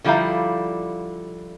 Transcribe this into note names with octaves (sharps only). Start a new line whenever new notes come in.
D3 F3 G3 E4 F5 A#5